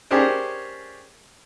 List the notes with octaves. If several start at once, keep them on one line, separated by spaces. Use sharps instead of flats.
C#4 D4 G4 G#4 A#4 C5